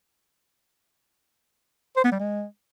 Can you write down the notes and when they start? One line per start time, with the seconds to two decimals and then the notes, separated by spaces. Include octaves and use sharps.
1.97 C5
2.04 B3
2.12 G3
2.20 G#3